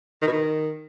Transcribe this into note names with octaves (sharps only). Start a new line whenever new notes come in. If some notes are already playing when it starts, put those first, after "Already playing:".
D#3
B2
D#3